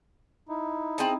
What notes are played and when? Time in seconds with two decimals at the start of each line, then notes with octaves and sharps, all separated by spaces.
0.49 D#4 E4
0.98 C4 G#4 A5